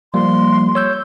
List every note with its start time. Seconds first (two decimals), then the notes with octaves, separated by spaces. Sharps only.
0.14 F3 G3 A#3 C6
0.75 C#5 E6 G6